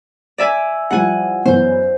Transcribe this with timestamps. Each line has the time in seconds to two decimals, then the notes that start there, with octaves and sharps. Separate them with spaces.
0.38 D5 E5 G#5
0.91 F3 G3 E4 F#5 G#5
1.45 F#2 E3 B3 C5